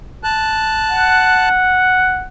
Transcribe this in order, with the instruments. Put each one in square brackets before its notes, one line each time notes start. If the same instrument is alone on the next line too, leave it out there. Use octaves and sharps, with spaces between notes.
[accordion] A5 F#6
[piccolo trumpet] F#5